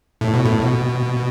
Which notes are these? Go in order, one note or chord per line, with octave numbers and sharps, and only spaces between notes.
A2
B2
A2
B2